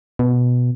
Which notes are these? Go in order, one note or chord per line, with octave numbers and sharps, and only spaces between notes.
B2